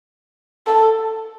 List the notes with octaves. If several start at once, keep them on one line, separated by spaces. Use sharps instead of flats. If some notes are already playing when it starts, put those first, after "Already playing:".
A4